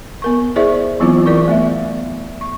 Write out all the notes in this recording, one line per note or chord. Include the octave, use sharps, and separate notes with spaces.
B3 A#4 C#6
E4 G#4 C5 D5 E5 C#6
E3 F#3 B3 C4 E4 F4
E3 E4 A#4 D5 C#6
A3 B3 E5
C#6